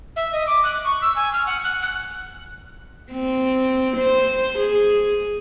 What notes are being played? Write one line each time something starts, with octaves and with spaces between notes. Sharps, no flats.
E5
D#5
D6
F#6
C#6
E6
G#5
F6
F#5
F#6
F#6
C4
C5
G#4